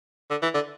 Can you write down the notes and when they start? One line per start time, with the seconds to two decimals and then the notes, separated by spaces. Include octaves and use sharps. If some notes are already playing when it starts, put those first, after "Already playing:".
0.30 D3
0.42 E3
0.54 D3